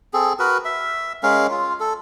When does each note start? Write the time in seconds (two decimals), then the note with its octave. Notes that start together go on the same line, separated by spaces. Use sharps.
0.14 C4 G#4 A4
0.39 F#4 A#4 B4
0.65 E5
1.23 G#3 C#4 A#4 F5
1.51 F4
1.80 A4